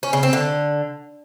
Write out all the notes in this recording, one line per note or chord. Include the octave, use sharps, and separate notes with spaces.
C#4
C#3
C4
D3